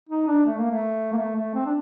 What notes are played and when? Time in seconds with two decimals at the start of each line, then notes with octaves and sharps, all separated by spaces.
0.09 D#4
0.28 D4
0.46 A3
0.58 A#3
0.71 A3
1.13 A#3
1.17 A3
1.36 A3
1.55 C4
1.66 D4